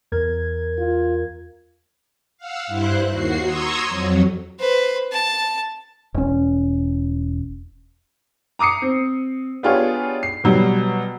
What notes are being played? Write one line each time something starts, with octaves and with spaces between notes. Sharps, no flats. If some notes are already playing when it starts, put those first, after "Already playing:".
E2 A#4 G#6
F4
F5 F#5 E6
G2 E4 C5 F#6
D#2 F#4 C7
A#5 C6 C#6 D#6 E6 G#6
F2 F#3
B4 C5
A5
E1 C#4
A#5 D6 D#6 C7 C#7
C4
B3 D4 F4 G4 G#4 C#5
C7
B2 F#3 G3